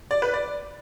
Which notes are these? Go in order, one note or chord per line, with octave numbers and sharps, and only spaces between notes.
D5
B4
D5